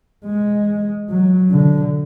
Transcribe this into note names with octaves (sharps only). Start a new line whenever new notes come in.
G#3
F#3
D3